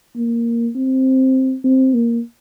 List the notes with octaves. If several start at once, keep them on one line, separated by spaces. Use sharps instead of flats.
A#3
C4
C4
A#3